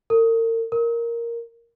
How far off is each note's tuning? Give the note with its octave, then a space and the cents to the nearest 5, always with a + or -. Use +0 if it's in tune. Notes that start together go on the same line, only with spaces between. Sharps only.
A#4 -40
A#4 +0